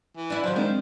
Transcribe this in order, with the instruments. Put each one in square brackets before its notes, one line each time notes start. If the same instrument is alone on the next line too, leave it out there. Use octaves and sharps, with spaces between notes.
[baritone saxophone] E3
[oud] D4 E4
[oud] D#3 F#3 [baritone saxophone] F3
[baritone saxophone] D#3 [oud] F3 [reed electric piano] G#3 C4 D4